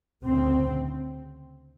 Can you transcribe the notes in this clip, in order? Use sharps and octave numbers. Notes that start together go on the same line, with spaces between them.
D2 C#3 C4